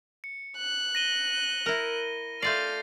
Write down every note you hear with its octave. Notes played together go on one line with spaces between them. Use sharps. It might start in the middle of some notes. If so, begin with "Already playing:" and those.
C#7
F#6
A#6 D#7 G7
E4 A#4
A3 F4 D5 F6 G6 A6 C7